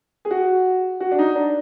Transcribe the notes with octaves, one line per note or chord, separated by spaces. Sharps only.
G#4
F#4
F#4
D4
D#4
D4